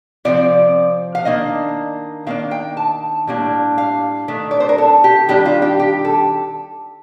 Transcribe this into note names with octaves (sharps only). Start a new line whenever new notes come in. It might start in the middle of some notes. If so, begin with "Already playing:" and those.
C3 F3 C4 D5
F5
D#3 A#3 D4 D#5
D#3 A#3 D4 F5
G5
A5
A2 G3 A#3 D4
F5
D#3 A3 D4
D5
C5
A#4
A4
G4
D#3 G3 D4 G4
F4
G4
G4
A4